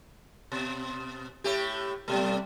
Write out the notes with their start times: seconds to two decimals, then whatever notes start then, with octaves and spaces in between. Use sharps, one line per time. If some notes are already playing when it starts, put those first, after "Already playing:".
0.52 B2
1.44 A2 A3 G4
2.08 B2 G3 A3